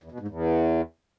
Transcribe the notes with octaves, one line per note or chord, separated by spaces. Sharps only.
E2
B2
G#2
E2